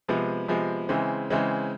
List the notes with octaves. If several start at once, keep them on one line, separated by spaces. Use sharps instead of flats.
C3 F3 G#3 B3
C3 F3 G#3 B3
C#3 E3 G#3 C4
C#3 E3 G#3 C4